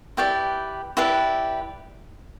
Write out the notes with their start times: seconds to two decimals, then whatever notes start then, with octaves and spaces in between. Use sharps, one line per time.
0.17 E4 G4 B4 D5 G5
0.97 E4 G4 B4 D5